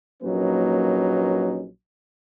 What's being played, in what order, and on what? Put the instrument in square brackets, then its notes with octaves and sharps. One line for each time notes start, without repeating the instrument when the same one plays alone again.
[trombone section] A#1 F#3 A#3 C#4 D#4 B4